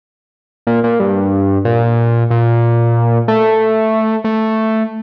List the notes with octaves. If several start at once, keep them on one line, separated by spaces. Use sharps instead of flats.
A#2
A#2
G2
A#2
A#2
A3
A3